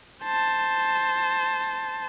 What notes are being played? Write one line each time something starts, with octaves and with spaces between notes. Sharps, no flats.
C5 A5